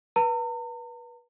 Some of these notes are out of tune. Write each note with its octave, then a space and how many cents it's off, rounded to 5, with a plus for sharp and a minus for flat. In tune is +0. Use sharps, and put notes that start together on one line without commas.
B4 -30 A#5 -45